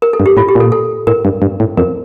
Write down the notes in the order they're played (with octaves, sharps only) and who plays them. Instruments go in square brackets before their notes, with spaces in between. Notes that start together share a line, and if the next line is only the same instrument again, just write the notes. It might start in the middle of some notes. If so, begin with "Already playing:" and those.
[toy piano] A#4
A4
[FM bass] G2
[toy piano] G4
[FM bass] A2 [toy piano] F4
[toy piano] G4
[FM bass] A#2 [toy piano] A4
[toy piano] A4
[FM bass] A2 [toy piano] A#4
[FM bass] G2
G2
A2
[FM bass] F2 [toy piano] A#4